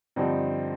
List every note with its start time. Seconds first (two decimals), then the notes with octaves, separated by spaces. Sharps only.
0.16 G2 D3 F3 C4 D#4